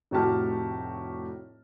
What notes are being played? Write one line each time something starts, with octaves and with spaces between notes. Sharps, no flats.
F1 A2 F#4 G4 A5 F6